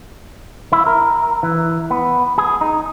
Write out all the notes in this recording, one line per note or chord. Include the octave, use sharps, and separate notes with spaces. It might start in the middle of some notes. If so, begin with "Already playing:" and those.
E4
A#4
E3
B3
G#4
D#4